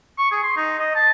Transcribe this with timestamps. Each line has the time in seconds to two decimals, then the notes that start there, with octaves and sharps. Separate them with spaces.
0.18 C#6
0.31 G#4
0.43 C6
0.57 D#4
0.79 D#5
0.95 A5